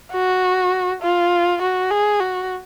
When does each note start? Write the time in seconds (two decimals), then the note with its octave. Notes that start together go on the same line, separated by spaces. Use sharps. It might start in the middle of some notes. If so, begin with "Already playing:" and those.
0.12 F#4
1.02 F4
1.62 F#4
1.90 G#4
2.20 F#4